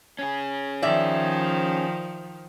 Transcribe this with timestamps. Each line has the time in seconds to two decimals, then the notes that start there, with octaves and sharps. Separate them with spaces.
0.19 C#4 G#4
0.82 D#3 F3 D5 E5